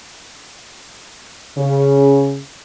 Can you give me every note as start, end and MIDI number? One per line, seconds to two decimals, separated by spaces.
1.58 2.37 49